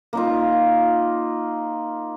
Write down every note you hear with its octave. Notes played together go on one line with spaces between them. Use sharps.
A#3 D#4 F4